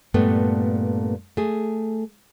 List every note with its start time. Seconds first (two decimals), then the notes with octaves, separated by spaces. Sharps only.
0.14 G2 A#2 A3 B3
1.37 A3 G#4